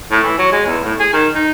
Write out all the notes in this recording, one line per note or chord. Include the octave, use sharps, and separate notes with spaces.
A2
E3
F#3
G#3
E2
A2
G#4
D#3
D#4